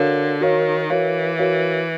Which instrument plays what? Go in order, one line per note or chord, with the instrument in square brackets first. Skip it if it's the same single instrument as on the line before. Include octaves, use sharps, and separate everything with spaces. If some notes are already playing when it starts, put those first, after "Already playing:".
Already playing: [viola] D3 [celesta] F#4 A#4 C#5 F5
[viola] D#3 [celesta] F#4 A#4 C#5 F5
[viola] E3 [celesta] F#4 A#4 C#5 F5
[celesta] F#4 A#4 C#5 F5